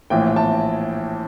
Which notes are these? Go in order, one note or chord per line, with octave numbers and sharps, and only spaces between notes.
A#1 A2 E3 G5
A5